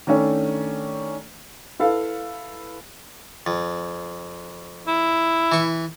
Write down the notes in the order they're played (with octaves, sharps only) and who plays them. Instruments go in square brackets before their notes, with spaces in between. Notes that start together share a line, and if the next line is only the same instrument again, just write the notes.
[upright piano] D#3 A3 C#4 D4
E4 A4 B4 F5
[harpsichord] F2
[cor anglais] E4
[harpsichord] E3 C#6